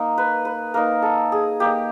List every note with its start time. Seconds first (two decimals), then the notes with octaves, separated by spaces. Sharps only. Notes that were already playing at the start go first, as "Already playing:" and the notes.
Already playing: A#3 D#4
0.18 B4
0.45 B4
0.74 A#3 D#4 A#4
1.02 A4
1.32 G#4
1.60 A#3 D#4 G4